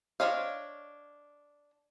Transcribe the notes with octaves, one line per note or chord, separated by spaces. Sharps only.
D4 C5 C#5 D#5 F5